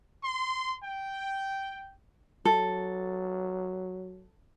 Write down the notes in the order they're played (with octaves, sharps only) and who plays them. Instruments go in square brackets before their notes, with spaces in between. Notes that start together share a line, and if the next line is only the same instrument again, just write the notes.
[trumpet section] C6
G5
[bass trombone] F#3 [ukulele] A4